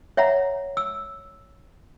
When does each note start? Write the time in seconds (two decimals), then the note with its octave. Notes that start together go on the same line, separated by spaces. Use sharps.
0.17 C#5 E5 F#5 A#5
0.77 E6